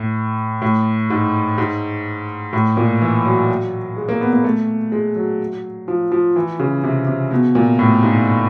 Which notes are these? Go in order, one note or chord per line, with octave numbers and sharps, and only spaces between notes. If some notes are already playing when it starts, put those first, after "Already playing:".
Already playing: A2
A2
G#2
G#2
A2
A#2
E3
F#3
G#3
A#3
B3
A#3
A3
G#3
F#3
F3
F3
E3
C#3
C3
C3
B2
A#2
A2
G#2